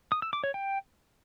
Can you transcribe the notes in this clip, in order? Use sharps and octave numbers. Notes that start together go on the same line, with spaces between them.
D#6
E6
D6
C#5
G5